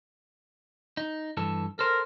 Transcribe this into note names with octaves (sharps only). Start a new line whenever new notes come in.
D#4
G2 E3 A4
A4 A#4 C5